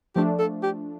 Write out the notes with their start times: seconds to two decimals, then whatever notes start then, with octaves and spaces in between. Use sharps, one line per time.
0.15 F3 A3 D4 G4
0.39 A4
0.63 G4